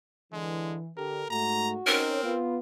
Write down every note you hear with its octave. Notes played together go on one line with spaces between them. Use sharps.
D3 E3 G#3
D3 G4 A4 A#4
G#2 A3 F#4 A#5
C4 C#4 D#4 A#4 C#5
B3 F4